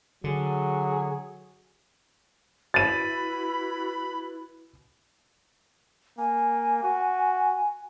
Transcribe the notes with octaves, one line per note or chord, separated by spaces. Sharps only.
D3 F#3 G#4
E4 F#4 B4 B5 A6 D#7
A#3 G#5
F#4